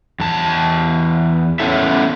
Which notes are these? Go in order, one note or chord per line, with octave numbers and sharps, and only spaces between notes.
E2 A5
B3 C#4 E4 A4 E5